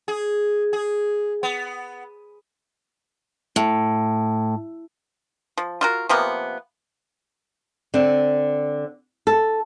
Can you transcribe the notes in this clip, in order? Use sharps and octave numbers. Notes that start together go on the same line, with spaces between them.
G#4
G#4
B3
A2
F3
F4 F#4 A#4
C3 F3 A#3 B3
D3 C4
A4